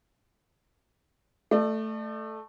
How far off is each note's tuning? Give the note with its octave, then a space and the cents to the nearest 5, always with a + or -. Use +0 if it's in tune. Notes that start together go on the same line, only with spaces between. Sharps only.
A3 +0 D5 +40